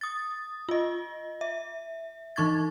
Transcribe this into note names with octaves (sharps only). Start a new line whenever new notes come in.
D#6 A6
F4 D#5
E5
E3 D#4 C#6 G#6 A6